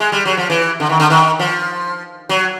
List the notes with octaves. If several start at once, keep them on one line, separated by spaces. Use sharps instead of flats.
G#3
G3
F#3
F3
E3
D3
D#3
D3
D#3
F3
F#3